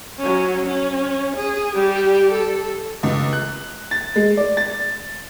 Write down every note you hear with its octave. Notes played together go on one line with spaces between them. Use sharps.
F#3 C#4
C#4
G#4
G3 G4
A4
C#2
F#6
A6
G#3
D5
A6